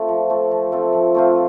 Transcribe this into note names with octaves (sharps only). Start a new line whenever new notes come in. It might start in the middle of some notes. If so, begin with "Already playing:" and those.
Already playing: A3 C4 F4
F3
A3 C4 F4
F3
A3 C4 F4
F3
A3 C4 F4